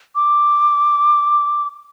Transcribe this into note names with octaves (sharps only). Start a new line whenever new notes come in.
D6